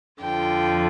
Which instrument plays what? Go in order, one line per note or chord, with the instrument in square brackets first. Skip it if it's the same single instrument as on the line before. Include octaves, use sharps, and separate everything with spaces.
[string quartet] F2 D3 F3 G5